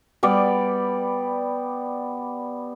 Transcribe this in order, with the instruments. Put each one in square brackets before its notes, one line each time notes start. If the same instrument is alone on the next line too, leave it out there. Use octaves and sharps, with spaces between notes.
[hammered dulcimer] G3 B3 D5 D6